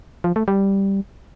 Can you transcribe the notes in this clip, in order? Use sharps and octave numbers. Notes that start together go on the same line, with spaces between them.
F3
A3
G3